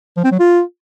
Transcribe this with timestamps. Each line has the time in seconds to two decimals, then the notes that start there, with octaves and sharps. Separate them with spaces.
0.17 F3
0.24 C4
0.32 F#3
0.39 F4